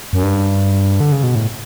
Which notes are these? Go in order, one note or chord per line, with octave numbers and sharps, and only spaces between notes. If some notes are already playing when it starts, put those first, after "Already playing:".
F#2
G2
D3
C#3
B2
A2